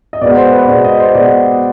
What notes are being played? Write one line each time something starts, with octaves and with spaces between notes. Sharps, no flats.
D#5
B2 G#3 B3 D5
C5
B4
B2 G#3 B3 D5
D#5
C5
B2 G#3 B3 D5